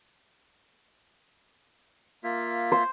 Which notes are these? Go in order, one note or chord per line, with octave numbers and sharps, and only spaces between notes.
A#3 F4 E5
C5